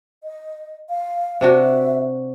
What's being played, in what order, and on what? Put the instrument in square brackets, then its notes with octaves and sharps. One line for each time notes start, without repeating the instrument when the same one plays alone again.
[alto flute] D#5
F5
[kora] C3 D4 F#4 [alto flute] E5